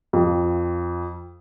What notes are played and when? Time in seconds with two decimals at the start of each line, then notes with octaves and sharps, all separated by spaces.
0.13 F2